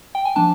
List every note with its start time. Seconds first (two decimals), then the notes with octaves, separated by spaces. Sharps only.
0.15 G5
0.25 G#5
0.36 F3 A#3 D4 A5